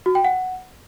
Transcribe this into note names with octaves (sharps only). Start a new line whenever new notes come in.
F#4
G5
F#5